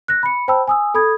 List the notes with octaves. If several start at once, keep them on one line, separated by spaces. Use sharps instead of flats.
F#6 A#6
B5 C#7
C5 G5 A5 B5 E6
G#5 D#6 E6
A4 B5 D#6 G#6